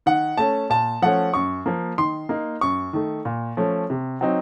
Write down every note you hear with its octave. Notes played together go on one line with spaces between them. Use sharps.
D#3 F#5
A3 C#4 A5
A#2 A5
F3 A3 C#4 F#5
F#2 C#6
F3 A#3
D#3 C6
A#3 D#4
F#2 C#6
D#3 A3
A#2
F3 A3 C#4
C3
F#3 C4 D#4